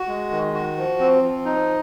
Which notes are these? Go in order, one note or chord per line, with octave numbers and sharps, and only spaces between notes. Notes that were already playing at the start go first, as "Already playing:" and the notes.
Already playing: F#4
G#3
D#3
F#4
F3
C4
F3
D#4